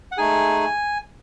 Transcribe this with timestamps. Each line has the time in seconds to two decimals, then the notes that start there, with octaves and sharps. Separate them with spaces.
0.12 F#5
0.18 A3 D#4 G#4 G#5